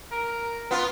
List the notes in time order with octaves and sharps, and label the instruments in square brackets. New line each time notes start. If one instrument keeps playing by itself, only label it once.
[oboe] A#4
[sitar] B3 F4